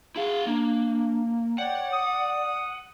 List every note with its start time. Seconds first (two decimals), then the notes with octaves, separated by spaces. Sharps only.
0.16 E4 G#4 F5 F#5
0.46 A#3 D4
1.58 C#5 D5 F#5 G5
1.93 D#6